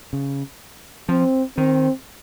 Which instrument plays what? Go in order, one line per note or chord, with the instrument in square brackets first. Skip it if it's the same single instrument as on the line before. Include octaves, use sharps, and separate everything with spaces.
[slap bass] C#3
[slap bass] F3 [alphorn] C4
[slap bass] D#3 [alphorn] C4